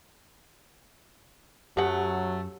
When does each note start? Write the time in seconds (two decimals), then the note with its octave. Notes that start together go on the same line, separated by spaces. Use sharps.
1.77 F#2 F#3 A3 G4 A4 F#5 G#5